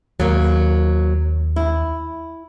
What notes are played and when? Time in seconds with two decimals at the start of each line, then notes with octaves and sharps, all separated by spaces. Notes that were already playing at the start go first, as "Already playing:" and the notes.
0.20 D#2 F#3 A#3
1.56 E4